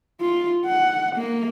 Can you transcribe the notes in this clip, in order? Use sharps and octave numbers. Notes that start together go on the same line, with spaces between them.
F4
F#5
A#3